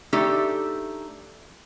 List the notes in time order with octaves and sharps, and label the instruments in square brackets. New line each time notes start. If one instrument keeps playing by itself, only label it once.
[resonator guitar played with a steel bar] A3 D4 D#4 G4 A4